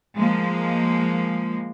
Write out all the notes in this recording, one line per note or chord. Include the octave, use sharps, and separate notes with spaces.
F3 G#3 A#3